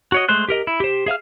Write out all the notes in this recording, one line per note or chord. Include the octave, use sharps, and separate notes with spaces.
F#4 C#5 D#5
G#3 A3 C5 F#6
G4 A#4 D#5
E4
G4 C5
G#4 E5 F5 F6